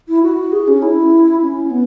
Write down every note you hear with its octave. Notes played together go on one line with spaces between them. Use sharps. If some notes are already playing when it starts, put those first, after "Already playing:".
E4
F#4
G#4
C#4
E4
C#4
B3